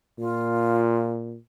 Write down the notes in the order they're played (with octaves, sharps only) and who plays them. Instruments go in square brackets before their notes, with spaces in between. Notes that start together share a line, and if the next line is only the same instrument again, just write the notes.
[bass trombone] A#2 [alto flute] F4